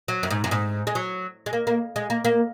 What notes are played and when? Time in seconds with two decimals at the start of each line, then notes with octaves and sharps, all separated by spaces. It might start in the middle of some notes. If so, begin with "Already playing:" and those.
0.08 F#3
0.23 F#2
0.31 G#2
0.44 F#2
0.51 G#2
0.87 G#3
0.95 F#3
1.46 G#3
1.53 A#3
1.67 A#3
1.96 G#3
2.10 A#3
2.25 A#3